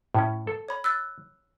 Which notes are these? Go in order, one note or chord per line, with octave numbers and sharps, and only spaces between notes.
A2 C#4
A4
C#5 B5
E6 F#6 A6